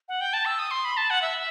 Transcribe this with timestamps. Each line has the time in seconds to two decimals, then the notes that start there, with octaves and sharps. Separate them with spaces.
0.09 F#5
0.21 G5
0.33 A5
0.45 E6
0.59 D#6
0.71 C6
0.85 B5
0.97 A5
1.10 F#5
1.22 E5